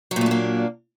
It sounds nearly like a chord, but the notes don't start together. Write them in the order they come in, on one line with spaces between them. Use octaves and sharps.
F#3 A#2 A3 D4 A#3